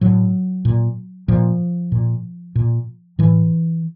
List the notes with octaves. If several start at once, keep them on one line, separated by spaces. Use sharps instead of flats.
A2 F#3
A#2
A#2 F3
A#2
A#2
A2 E3